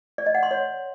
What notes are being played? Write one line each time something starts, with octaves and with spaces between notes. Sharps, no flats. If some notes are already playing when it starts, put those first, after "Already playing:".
D5
D#5
F#5
C6
C#5